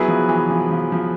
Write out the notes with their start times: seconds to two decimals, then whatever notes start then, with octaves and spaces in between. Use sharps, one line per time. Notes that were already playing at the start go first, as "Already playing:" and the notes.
Already playing: F#3 B3 E4 G#4 B4
0.08 F3
0.29 E3
0.50 F3
0.71 F3
0.92 F3